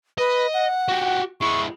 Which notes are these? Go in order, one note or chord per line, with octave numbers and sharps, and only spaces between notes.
B4 D#5
F#5
F#4 G4
G#3 E4 C#6